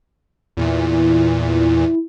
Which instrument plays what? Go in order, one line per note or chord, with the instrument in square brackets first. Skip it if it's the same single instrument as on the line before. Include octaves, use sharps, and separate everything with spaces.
[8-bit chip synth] E2 A#2 E3 [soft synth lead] E4